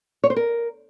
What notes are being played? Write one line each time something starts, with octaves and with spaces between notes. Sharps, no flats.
C#5
C5
A#4